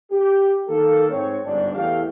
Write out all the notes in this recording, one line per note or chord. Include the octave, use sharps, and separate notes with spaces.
G4
D#3 A#3 A4
G#2 C4 C#5
G1 C#2 G#2 D4
E2 A2 E3 A3 G4 F5